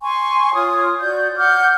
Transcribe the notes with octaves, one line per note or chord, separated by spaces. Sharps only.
G#5 C6 C#6
F4 C#5 D#6
F#4 D5 G6
F#5 D6 F6 G6